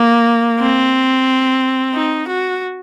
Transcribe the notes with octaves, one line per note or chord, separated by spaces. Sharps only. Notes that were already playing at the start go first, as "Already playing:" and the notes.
Already playing: A#3
C4
D#4
F#4